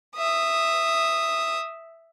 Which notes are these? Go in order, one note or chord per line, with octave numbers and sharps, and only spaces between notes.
E5 D#6